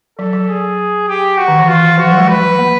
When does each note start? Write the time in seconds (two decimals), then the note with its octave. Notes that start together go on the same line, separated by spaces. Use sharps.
0.19 F#3 A4
0.33 F#3
0.49 G#4
1.08 G4
1.38 F#4
1.48 D#3
1.59 E3
1.68 F4
1.98 F3 F#4
2.08 F#3
2.18 G#3
2.28 B4
2.59 A#3